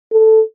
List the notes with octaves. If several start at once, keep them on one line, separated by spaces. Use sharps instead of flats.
A4